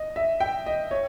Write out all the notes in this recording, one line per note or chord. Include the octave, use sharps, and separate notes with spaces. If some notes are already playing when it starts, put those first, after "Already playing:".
Already playing: D#5
E5
G5
D#5
C#5